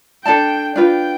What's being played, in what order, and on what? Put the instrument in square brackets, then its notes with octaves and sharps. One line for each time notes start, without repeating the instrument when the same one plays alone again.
[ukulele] D4 A4 D5 A5 [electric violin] G5
[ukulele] D4 F4 B4 [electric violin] G5